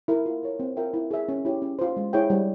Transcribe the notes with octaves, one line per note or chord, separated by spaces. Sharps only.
E4 A#4
F4
A#4 C#5
C4
F4 A#4 E5 G5
E4
G#4 E5
C#4
E4 G4 C#5
C#4
F4 C5
G#3
E4 G#4 C#5 G5
G3